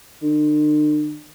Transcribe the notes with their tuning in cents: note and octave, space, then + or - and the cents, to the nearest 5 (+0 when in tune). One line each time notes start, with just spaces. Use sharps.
D3 +45